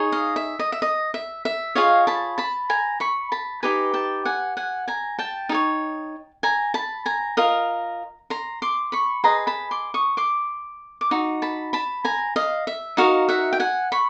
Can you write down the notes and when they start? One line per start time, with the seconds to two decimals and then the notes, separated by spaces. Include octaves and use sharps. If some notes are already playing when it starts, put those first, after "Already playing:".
Already playing: D#4 G#4 C#5
0.12 D#5 F5
0.36 E5
0.59 D#5
0.72 E5
0.82 D#5
1.14 E5
1.45 E5
1.75 F4 G#4 C#5 D#5 F5
2.07 A5 B5
2.38 A5 B5
2.70 G#5 A#5
3.00 B5 C#6
3.32 A5 B5
3.63 D#4 G4 B4 G#5 A#5
3.94 G5 A5
4.25 F#5 G#5
4.57 F#5 G#5
4.88 G#5 A#5
5.19 G5 A5
5.49 D#4 G#4 C#5
6.43 G#5 A#5
6.74 A5 B5
7.06 G#5 A#5
7.37 F4 A#4 D#5
8.30 A#5 C6
8.62 C6 D6
8.92 B5 C#6
9.24 G#4 B4 D#5 A#5 C6
9.47 A5 B5
9.71 C6 D6
9.94 C#6 D#6
10.17 C6 D6
11.01 D6
11.11 D#4 F#4
11.42 A5 B5
11.73 A5 B5
12.05 G#5 A#5
12.36 D#5 F5
12.67 E5
12.97 D#4 F#4 A#4 D#5 F5
13.29 E5 F#5
13.53 G5
13.60 F#5 G#5
13.92 B5 C#6